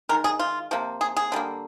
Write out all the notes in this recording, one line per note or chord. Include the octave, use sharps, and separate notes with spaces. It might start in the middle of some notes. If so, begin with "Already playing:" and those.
D#3 G#3 A#4
G#4
F4
C3 F3 A#3
G#4
G#4
D3 G3 A#3